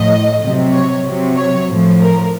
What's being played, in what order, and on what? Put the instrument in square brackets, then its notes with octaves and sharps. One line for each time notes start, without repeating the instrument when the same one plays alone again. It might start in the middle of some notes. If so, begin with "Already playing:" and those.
Already playing: [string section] A2 F3 D#5
C3 F#3
C#5
C3 F#3
C#5
A2 F3
A#4